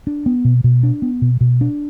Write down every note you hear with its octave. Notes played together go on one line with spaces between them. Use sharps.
D4
B3
B2
B2
D4
B3
B2
B2
D4